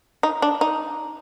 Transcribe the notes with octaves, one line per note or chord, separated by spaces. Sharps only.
D#4
D4
D#4